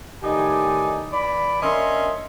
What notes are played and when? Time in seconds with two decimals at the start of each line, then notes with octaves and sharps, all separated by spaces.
0.23 A2 D#3 D#4 G4 D5 G#5
1.12 E3 D5 B5
1.63 C#4 D4 A#4 D#5 E5 C6